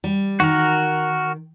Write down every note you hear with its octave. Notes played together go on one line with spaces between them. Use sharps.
G3
D#3 F#4 A#4